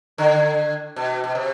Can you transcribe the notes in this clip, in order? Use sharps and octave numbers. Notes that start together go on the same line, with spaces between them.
D3
B2
B2
C3